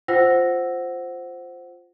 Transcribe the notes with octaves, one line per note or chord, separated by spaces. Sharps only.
F4 C5 F#5 G5 E6 A#6